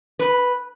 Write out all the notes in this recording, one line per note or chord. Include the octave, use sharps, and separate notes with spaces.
B4